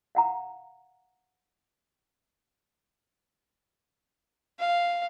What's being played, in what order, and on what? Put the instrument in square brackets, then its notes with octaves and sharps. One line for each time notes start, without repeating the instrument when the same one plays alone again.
[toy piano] F5 F#5 A#5
[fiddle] F5